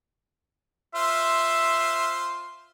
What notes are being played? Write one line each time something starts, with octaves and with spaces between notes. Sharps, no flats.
F4 C5 E5